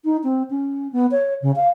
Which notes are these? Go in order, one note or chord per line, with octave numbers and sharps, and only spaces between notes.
D#4
C4
C#4
B3
C#5
C#3
F5